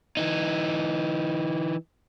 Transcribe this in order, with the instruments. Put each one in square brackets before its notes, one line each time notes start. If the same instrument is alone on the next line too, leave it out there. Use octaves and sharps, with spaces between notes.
[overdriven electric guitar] E3 D#4